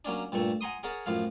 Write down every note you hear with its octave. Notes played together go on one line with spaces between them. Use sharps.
F#3 A#3 C#4 D4
G2 A#2 A3 C#6
F#5 G#5 A#5 C6 D#6
G#4 A#4 C#5 F#5 A5
F#2 A2 F3 F5